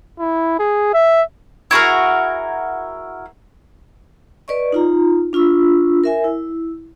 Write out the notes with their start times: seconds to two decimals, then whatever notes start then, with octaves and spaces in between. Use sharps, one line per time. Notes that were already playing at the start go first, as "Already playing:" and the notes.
0.20 E4
0.59 G#4
0.94 E5
1.71 E4 F#4 G#4 A#4
4.48 B4 D5 D#5 C#6
4.72 D#4 F4 A#5
5.33 D4 F4 C#6 E6
6.04 A#4 E5 G#5
6.24 E4